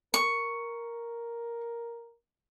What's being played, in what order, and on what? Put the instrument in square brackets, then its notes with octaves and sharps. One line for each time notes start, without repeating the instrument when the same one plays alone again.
[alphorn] A#4 [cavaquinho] C#6